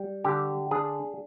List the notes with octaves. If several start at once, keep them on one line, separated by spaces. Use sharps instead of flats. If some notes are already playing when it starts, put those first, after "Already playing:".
Already playing: G3
D3 G4
D4 G#4